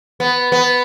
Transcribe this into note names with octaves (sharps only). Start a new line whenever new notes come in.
B3
B3